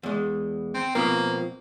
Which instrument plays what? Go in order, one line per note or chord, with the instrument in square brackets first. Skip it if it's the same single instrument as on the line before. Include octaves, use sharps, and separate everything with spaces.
[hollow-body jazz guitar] E2 G#3
[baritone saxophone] C4
[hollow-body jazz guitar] B2 F3 C4 [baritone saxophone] A#3